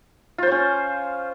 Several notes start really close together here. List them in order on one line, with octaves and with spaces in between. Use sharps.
F4 C5 C#5 C#4